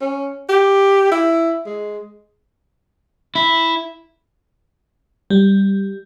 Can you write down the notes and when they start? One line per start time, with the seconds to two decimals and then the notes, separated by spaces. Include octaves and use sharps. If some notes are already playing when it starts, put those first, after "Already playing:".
0.01 C#4
0.49 G4
1.12 E4
1.66 G#3
3.35 E4
5.30 G3